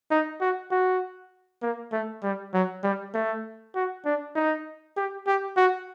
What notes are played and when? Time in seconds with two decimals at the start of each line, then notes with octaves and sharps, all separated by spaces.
0.11 D#4
0.41 F#4
0.71 F#4
1.62 A#3
1.93 A3
2.23 G3
2.54 F#3
2.84 G3
3.14 A3
3.75 F#4
4.05 D4
4.36 D#4
4.97 G4
5.27 G4
5.57 F#4